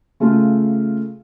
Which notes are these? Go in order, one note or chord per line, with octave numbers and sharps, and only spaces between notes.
C#3 A3 F4